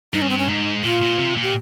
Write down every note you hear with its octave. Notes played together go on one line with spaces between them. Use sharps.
G2 D#4
C#4
C4
C#4
G#2 D#4
A#2 F4
A#2
C3
A#2
G4